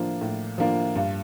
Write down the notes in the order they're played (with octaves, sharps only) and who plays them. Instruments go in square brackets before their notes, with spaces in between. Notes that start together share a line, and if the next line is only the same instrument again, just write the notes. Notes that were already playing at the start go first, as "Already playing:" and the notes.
Already playing: [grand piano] A2 F3 A#3 D4
A2
F3 A#3 D4
G2